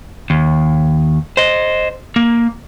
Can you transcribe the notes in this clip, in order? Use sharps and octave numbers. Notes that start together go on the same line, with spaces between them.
D#2
C5 D#5
A#3